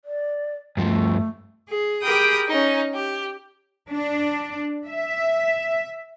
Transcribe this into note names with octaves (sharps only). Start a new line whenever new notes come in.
D5
G2 F3 A3
G#4
G4 G#4 A#4 G5 B5 D#6
C#4 D#4
G4
D4
E5